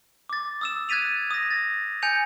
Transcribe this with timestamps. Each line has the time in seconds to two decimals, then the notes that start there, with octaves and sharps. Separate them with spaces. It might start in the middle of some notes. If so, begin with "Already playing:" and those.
0.29 D6 A6
0.61 D#6 E6 E7
0.89 F#6 G#6 A6 B6 D#7 F7
1.31 D#6 A#6
1.51 A6
2.02 G#5 G6 C#7 F7